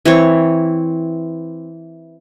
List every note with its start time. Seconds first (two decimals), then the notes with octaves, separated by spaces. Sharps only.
0.05 E3 C4 C#5